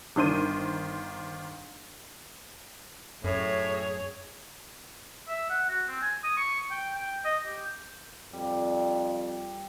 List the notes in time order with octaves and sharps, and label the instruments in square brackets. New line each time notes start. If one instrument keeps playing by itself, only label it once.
[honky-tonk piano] G1 D#3 C5 D#7
[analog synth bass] F#2 [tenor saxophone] A2 [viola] G#4 C#5
[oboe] E5
F#5
F#4
C4
G#5
D#6
C#6
G5
G5
D#5
G4
[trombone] F2 [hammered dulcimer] G3